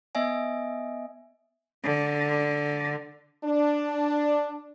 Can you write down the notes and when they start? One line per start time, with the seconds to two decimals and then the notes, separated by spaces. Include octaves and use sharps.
0.15 B3 D#5 E5 G#5
1.83 D3
3.44 D4